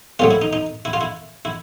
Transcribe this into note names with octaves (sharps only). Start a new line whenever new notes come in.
A#1 A2 F#3 F4
E4
D#4
D#4
E4
F4
E4
E4